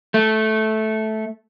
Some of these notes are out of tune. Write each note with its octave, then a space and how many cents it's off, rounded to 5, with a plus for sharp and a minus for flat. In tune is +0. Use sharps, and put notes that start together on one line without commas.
A3 -10